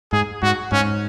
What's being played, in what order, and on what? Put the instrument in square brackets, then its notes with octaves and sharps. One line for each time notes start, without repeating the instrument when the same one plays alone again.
[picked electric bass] G#2 [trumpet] G#4
[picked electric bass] G#2 [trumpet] F#4
[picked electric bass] G#2 [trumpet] C#4